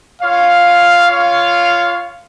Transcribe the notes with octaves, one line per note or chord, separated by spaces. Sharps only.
F4 C#5 F5
F4 C#5 F5